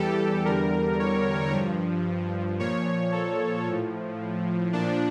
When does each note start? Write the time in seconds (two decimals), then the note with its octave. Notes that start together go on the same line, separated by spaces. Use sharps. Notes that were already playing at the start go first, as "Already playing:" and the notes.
Already playing: E2 E3 G3 G4 A4
0.45 E2 D3 G3 A#4
0.99 C#5
1.53 G2 F3
2.59 A#2 F3 C#5
3.12 A4
3.67 A2 F3
4.73 A#2 F3 D4